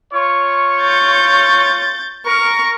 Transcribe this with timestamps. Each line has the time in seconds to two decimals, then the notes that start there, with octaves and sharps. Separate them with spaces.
0.14 F4 C#5 C#6
0.81 G6 A6
2.26 A#4 C#6